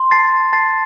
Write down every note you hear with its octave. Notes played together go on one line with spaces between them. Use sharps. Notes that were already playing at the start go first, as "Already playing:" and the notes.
Already playing: C6
A5 A6 C7
A5 A6 C7